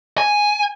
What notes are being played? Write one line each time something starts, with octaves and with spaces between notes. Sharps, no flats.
G#5